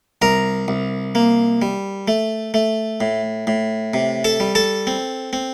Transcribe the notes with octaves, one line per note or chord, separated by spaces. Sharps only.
C2 A#4 A#5
C2
A#3
G3
A3
A3
A2
A2
C3
A4 A5
G3
A4 A5
C4
C4